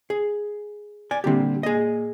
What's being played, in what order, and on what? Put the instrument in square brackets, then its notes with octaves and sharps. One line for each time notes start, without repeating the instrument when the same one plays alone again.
[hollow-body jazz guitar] G#4
D5 G#5
[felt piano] A#2 D3 G3 [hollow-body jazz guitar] C4 G4
[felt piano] A#2 [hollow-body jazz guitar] G#4 D#5